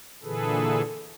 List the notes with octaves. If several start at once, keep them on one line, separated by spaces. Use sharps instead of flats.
A#2 D3 E3 G#4 A4 B4